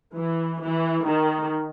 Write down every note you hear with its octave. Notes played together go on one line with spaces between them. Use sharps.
E3
E3
D#3